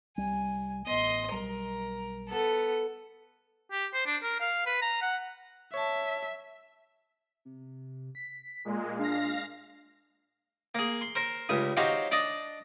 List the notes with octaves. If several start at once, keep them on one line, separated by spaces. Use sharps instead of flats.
C2 G3 G#5
A1 B3 D#5 C6
B1 G3 A#4
B3 A4
G4
C5
D4
A#4
F5
B4
A#5
F#5
C#5 E5 A5
C3
B6
A#2 G#3
D4 F5 A#6
A#3 G#4
C6
A#4 C5
C#2 G2 D#6
D#4 F#4 G4 C5 C#5 F5
D4 D5 D#5